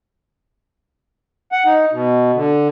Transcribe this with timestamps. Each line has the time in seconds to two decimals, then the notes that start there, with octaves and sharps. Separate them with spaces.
1.52 F#5
1.66 D#4
1.92 B2
2.35 D3